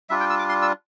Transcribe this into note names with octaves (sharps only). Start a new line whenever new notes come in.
G3 D4 F4 E5
G5
E6
D6
C6
E6